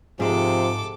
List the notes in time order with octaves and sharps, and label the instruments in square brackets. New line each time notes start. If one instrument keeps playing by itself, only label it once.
[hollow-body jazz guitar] G#2 G#3 [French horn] C3 [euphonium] F3 [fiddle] A4 D6